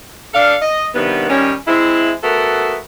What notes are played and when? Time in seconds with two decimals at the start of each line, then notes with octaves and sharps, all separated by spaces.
0.34 D4 A4 F5
0.61 D#5
0.94 G2 C3 D#3 B3
1.30 D#3 G3 C#4
1.67 G#3 C4 E4
2.23 A3 B3 F#4 A4 A#4